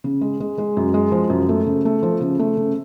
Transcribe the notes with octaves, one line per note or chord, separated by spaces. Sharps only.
C#3
G#3
G#3
G#3
F#2
G#3
F3
F#2
A3
C#3
A3
F3
C#3
A3
C#3